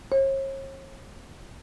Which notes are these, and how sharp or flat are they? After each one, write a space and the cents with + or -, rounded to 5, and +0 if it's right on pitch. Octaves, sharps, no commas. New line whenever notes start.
C#5 -40